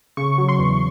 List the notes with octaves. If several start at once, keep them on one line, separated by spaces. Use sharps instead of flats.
C#3 C#6
F#3
C6
E2